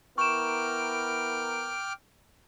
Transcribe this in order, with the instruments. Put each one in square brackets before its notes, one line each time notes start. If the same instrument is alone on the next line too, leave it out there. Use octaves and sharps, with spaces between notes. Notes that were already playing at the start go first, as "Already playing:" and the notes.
[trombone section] B3 E4 A#4 [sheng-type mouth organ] G5 D6 F6 [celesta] C#6 E7